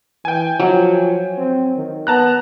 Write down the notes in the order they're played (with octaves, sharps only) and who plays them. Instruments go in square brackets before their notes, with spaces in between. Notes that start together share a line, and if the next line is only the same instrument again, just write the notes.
[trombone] E3 [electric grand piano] G5 G#5
[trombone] F3 [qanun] F#3
[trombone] C4
D#3
[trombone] B3 [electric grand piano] A5 A#5 F#6